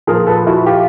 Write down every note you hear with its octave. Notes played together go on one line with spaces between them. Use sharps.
A#2 F3 G#4 A#4
A4 B4
E4 F#4
F4 G4